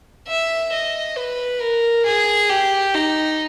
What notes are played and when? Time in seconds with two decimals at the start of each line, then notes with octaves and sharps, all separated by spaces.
0.27 E5
0.72 D#5
1.16 B4
1.61 A#4
2.05 G#4
2.50 G4
2.94 D#4